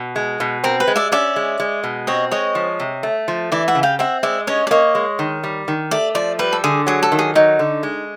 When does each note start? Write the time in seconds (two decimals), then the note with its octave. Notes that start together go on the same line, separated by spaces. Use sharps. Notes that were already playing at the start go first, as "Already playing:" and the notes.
Already playing: B2
0.16 G#3
0.40 B2
0.64 C4 A#4
0.80 B4
0.88 G#3
0.96 D5 E5
1.12 C#4 D5 E5
1.36 G#3
1.60 G#3
1.84 B2
2.07 C4 C#5 D#5
2.31 G#3 C#5 D#5
2.55 F3
2.80 C3
3.03 A3
3.28 F3
3.52 E3 D5 E5
3.68 E5 F#5
3.75 C#3
3.83 F5 G5
3.99 C4 E5 F#5
4.23 G#3 D5 E5
4.47 C#4 C#5 D#5
4.67 D5
4.71 A#3 C#5 D#5
4.95 G#3
5.19 D#3
5.44 G3
5.68 D#3
5.91 A3 D5
6.15 F3 D5
6.39 G3 B4
6.53 A4
6.64 D3 G#4
6.87 F#3 G#4
7.03 A4
7.12 D#3
7.19 G#4
7.35 F#3 D#4
7.59 D3
7.83 G#3